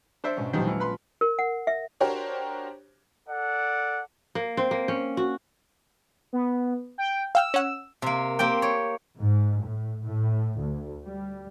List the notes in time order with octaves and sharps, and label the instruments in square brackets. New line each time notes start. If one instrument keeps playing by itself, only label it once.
[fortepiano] D4 C5 E5 [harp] C#7 D7
[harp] G#2 B2 C#4
[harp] A#1 E2 F#3 [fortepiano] D#3 G3 C5
[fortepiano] E3 [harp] F6 C#7 D7
[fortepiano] B4 B5 C6
[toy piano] A#4
F#5
E5
[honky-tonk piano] D4 F#4 G4 A#4 C5 C#5
[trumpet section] A4 D5 F#5
[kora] A#3
C4
A#3
C#4
F#4
[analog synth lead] B3
G5
[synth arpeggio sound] F5 G5 F6 [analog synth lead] E6
[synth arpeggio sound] C#4 F#5
[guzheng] C3 A#3
A#3 C4 G4 G5
C#5
[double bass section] G#2
A2
A2
D2
G3